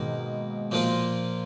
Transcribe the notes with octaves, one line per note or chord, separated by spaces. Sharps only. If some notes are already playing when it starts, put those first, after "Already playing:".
Already playing: G#2 B2 D#3 A#3
A#2 F3 A#3 F4